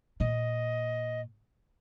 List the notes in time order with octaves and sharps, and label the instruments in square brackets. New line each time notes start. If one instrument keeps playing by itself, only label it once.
[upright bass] A#2 [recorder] D#5